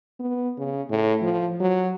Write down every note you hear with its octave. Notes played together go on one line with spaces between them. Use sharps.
B3
C#3
A2
F3
F#3